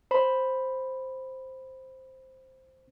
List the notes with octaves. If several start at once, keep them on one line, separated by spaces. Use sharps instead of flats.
C5 B5